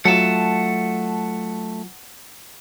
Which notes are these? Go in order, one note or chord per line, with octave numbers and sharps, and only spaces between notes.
F#3 A3 F4 F#5 A5